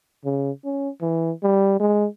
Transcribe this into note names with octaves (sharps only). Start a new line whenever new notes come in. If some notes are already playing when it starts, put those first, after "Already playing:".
C#3
C#4
E3
G3
G#3